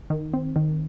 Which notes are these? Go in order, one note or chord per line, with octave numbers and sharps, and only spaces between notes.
D#3
C4
D#3